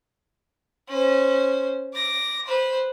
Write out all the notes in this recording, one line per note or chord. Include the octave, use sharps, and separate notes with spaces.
C#4 C5
D6 A#6
B4 C5